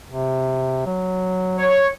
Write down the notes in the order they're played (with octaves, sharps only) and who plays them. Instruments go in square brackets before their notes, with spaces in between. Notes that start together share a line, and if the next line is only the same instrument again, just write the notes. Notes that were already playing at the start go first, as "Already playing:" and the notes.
[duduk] C3
F#3
[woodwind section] C#5